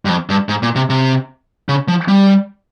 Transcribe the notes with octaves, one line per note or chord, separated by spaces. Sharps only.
G2
F2
G2
G#2
A#2
C3
C3
C#3
F3
G3